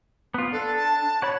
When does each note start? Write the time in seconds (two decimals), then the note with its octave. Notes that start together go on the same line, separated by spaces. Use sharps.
0.34 B3 F4
0.52 D4 A4
0.76 A5
1.22 F#4 C#5 B5